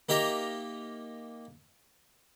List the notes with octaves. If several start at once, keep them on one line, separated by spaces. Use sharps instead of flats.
A#3 D#4 G4 E5 A#5